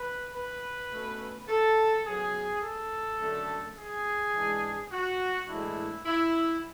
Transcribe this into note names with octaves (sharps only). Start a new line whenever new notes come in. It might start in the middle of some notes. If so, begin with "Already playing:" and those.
Already playing: B4
B4
B2 A3 C#4
A4
C#3 F#3 B3 G#4
A4
F#2 D3 A3 D4
G#4
G#2 E3 G#3 D4
F#4
A2 E3 G#3 D4 E4
E4